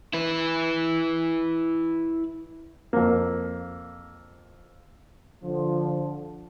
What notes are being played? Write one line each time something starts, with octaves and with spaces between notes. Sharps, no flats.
E4 B4
F2 A#3
D3 F3